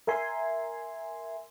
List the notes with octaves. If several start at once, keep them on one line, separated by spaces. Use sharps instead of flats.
A#4 E5 G#5 C6